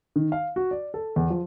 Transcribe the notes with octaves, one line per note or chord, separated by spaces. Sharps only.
D#3
F5
F#4
D5
A4
E2
F3